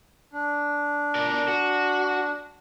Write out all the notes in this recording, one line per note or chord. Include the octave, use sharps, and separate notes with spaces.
D4
A#4 D5
F#4